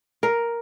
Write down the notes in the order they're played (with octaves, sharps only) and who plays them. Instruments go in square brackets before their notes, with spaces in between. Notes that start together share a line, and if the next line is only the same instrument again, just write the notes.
[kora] A#4